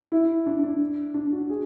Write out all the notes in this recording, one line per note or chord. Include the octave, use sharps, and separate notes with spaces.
E4
D4
D4
D4
F#4
G#4